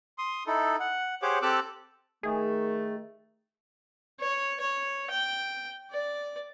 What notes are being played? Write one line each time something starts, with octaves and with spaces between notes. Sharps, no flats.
C6 D#6
D#4 E4 A4
F#5
G4 G#4 C5 C#5 F#5 D6
C4 G4 A4 D6 E6 F#6
D#3 A3 G#4
C#5
C#5
G5
D5